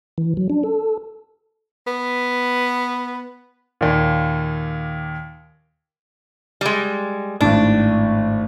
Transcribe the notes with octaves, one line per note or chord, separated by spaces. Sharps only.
E3
F#3
D4
A4
B3
D#2 A#2
G3 G#3
G#1 A2 D4